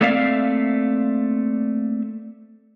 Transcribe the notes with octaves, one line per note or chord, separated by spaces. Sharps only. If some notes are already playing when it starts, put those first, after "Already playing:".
A3 A#3 C4 D5 E5 F5